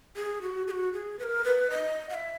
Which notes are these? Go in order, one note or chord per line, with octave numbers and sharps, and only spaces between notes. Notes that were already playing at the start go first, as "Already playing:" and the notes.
G#4
F#4
G#4
F#4
G#4
B4
A#4
B4
D#5
F#5
E5